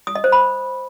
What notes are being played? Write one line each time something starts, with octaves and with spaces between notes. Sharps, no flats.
D#6
D#5
C5
B5